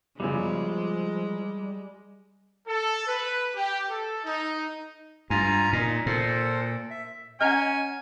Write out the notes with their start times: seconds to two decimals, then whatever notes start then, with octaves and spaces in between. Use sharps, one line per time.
0.20 B1 F#2 C#3 F3 G3 G#3
2.67 A4
3.06 B4
3.54 G4
3.89 A4
4.24 D#4
5.30 G2 F4 G#5 A#5
5.73 A#2 D#4
6.06 A#2 F4 A4 C5
6.90 E5
7.41 C#4 D#5 F#5 G#5 A#5 F6